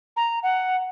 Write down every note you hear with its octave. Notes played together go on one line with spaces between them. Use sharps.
A#5
F#5